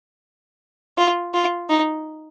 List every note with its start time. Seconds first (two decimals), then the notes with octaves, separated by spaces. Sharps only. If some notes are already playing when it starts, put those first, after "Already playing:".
0.98 F4
1.34 F4
1.69 D#4